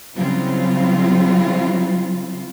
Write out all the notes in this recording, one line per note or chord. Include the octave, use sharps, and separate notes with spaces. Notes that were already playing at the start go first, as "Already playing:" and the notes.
C#3 F#3 G3 C4 E4 F4